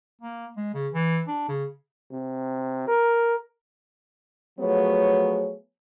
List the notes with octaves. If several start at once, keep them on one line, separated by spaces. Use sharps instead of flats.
A#3
G#3
C#3
E3
D4
C#3
C3
A#4
F3 F#3 A3 B3 G#4 C#5